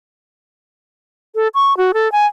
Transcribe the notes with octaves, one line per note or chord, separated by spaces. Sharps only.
A4
C#6
F#4
A4
G#5